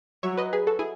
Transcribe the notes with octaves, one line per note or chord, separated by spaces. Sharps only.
F#3 C#5 E5
B4 D#5
G#4 B4
F#4 A4
E4 G#4